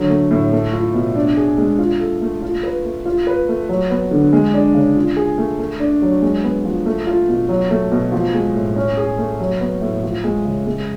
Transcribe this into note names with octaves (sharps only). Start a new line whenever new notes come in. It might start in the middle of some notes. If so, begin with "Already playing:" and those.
Already playing: D3 F#3
A3
A2
A3
F4
B2
D4
G#4
G#3
F4
A4
A3
F4
B4
A3
F4
B4
A3
F#3
B3
D3
G#3
D4
C#3
F4
G#4
A3
A3
D4
F#3
G#3
B3
F3
A3
F4
B2
F#3
A3
B2
F3
G#3
A2
C#4
G#4
A3
F#3
B3
A2
F3
G#3
C#3
G#3